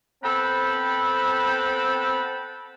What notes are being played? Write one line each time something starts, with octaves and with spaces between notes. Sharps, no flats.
B3 C4 A4 G5 A5 B5